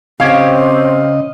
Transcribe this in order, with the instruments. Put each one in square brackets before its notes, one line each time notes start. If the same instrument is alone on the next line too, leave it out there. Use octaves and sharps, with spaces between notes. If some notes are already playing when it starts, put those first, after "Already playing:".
[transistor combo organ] C#3 D#5 [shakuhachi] C4 [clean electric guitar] G4 C#5 [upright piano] F5